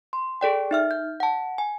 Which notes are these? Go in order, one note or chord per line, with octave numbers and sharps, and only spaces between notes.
C6
G#4 A4 D5 G5
D#4 E5 F6
G6
F#5 A5
G#5